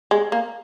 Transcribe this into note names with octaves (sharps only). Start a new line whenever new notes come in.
G#3
A#3